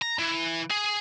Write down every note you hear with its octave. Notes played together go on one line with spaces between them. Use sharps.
A#5
E3
G#4